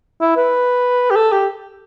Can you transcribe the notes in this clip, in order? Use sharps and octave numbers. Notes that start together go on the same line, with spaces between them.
E4
B4
G4
A4
G4